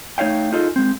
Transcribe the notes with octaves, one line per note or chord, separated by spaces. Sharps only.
A3 D#4 C#5 F5 G5
D#4 F4 G#4 A4 D#5
G#3 C4